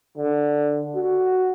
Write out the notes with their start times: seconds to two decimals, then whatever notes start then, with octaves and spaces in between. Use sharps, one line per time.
0.17 D3
0.95 F#4